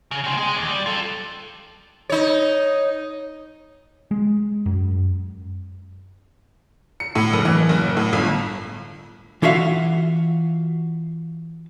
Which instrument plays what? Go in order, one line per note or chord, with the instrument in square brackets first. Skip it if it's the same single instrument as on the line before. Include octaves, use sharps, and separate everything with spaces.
[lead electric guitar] C#3
C#3 C4
G#3 G#4
D#2
G3
F4 A4
[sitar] D#4 C#5
[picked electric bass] G#3
F#2
[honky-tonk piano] C#7
A2
F#1
E3
F#1
A2
G1
[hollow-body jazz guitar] E3 F4 F#4 E5 F5